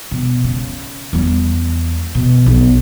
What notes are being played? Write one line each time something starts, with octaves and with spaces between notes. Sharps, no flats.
B2
C#3
E2 G3
B2
B1